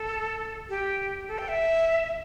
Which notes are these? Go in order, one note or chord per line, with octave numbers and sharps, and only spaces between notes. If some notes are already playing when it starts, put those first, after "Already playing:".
Already playing: A4
G4
A4
G5
E5